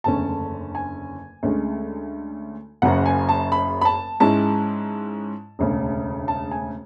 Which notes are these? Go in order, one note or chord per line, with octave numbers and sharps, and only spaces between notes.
F#1 E2 D3 A3 C#4 A5
G#5
D2 D3 G#3 C#4
F#1 F#2 C#3 F#3 F#5
G#5
A5
B5
B5
A5
G#2 G#3 C#4 E4 A5
E1 D2 C#3
A5
G#5